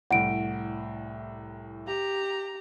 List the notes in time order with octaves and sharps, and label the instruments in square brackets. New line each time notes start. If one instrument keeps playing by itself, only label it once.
[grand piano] C2 A2 [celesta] F#5 D7
[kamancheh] G4 A#5